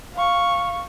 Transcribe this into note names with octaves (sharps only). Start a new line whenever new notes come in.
F5 C#6